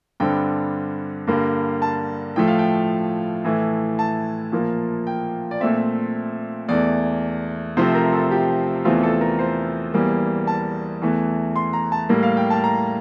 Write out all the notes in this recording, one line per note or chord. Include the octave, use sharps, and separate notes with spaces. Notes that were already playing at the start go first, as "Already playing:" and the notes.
G2 D3 G3 C4 G5
G2 D3 G3 A#3
A5
A2 F3 A3 G5
F5
G5
A2 E3 A3
A5
A#2 F3 A#3
G5
D5
A#2 A3 C4 E5
E2 E3 A3 D5
C3 F3 A3 C4 C5
A#4
A4
G4
E2 E3 A3 C4 F4
A4
A#4
C5
E2 E3 G3 A#3
A5
E2 E3 A3
C6
A#5
A5
A2 G3 A#3
F5
G5
A5
A#5